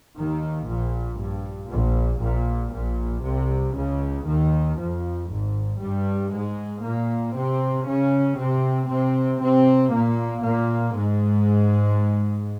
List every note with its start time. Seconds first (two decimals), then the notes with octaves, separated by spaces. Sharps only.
0.17 D#2 D#3
0.68 A#1 A#2
1.21 G2
1.71 A#1 A#2
2.22 A#1 A#2
2.74 A#1 A#2
3.25 C2 C3
3.77 C#2 C#3
4.28 D#2 D#3
4.80 F2 F3
5.31 G#1 G#2
5.82 G2 G3
6.34 G#2 G#3
6.85 A#2 A#3
7.37 C3 C4
7.88 C#3 C#4
8.40 C3 C4
8.91 C3 C4
9.43 C3 C4
9.94 A#2 A#3
10.46 A#2 A#3
10.97 G#2 G#3